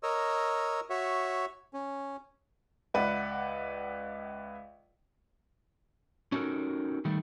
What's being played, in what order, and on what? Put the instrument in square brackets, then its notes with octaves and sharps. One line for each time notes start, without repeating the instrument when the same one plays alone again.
[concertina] A#4 C#5 D#5 E6
F#4 C#5 E5
C#4
[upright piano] C#2 B4 D5 E5 F#5
[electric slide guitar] C#4 D#4 F#4 G4 A4 A#4
D#3 G3 A3